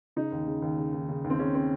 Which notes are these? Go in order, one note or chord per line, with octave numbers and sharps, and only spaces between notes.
C#3 D#4
D#2
C#3
D#2
C#3
D#2
C#3
D#2
C4
C#3 C#4
C4